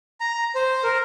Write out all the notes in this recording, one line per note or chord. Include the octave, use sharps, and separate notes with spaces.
A#5
C5
A#4